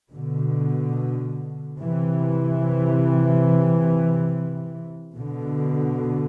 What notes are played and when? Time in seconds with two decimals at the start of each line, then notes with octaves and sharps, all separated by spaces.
0.12 B2 D3
1.80 C3 E3
5.18 B2 D3